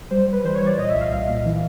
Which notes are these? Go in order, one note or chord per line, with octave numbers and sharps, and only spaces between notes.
G3 C5
G3 B4
E3 C5
C#5
G3
D5
A#2 D#5
E5
C2
F5
C2
A#2
E3